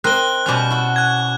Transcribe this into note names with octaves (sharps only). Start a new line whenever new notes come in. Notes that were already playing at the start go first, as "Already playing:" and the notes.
C4 A#4 D#5 F#6 G7
B2 G3 C#4 D6 F#6
E4 F#4
F#6 G#6